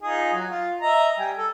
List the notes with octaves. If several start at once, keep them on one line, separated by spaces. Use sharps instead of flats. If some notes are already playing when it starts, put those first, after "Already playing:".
D#4 F4 G#4
F#3
F4
D#5 E5 A#5
G3 G5 G#5
A4